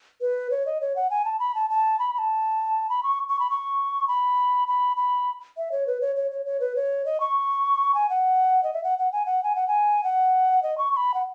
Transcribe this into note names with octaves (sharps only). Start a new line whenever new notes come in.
B4
C#5
D#5
C#5
F#5
G#5
A5
B5
A5
A5
B5
B5
A5
B5
C#6
C#6
B5
C#6
B5
B5
B5
E5
C#5
B4
C#5
C#5
C#5
C#5
B4
C#5
D#5
C#6
G#5
F#5
D#5
E5
F#5
F#5
G#5
F#5
G#5
F#5
G#5
F#5
D#5
C#6
C#6
B5
F#5